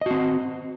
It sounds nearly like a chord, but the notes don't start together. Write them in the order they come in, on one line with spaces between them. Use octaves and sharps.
D#5 F#4 C4